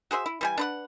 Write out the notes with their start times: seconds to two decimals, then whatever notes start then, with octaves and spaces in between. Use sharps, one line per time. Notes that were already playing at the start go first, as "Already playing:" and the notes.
0.11 F#4 G#4 C5 E5
0.26 E4
0.41 E3 G3 G#5
0.58 D4 B4 F#5